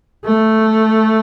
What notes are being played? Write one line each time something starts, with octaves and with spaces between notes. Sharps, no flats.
A3